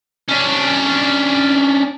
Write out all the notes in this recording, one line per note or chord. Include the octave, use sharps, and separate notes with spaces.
C#4 D4